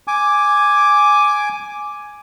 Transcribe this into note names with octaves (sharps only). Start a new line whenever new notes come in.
G#5 D6